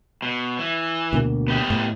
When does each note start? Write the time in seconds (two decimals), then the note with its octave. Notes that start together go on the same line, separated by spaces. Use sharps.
0.22 B2
0.59 E3
1.13 D2 B2 A#3
1.48 B3 G4 D#5
1.70 A2